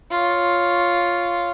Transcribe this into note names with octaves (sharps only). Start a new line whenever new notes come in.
F4 C#5